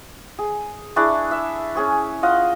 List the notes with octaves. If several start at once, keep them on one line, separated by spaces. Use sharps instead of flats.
G#4
D4 E4 G#4 C#6
E5
C#4 G#4 C#5
F4 D#5 F5 F#5